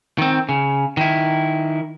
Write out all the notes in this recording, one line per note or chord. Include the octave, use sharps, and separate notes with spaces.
D#3 C4
C#3
D#3 E4